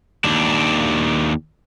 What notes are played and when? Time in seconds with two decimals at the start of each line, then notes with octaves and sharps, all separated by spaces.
0.25 D#2 D4